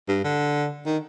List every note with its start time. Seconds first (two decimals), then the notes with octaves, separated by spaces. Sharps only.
0.08 G2
0.24 D3
0.86 D#3